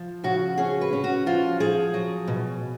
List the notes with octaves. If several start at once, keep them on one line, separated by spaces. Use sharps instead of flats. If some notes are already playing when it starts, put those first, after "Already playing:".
Already playing: F3
C#3 F#4
C#4 G#4
B4
C#4
F#4
F3 F4
F3 G#4
F#3
B2